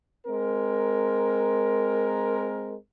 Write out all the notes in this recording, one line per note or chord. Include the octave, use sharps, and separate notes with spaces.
G#3 C4 A#4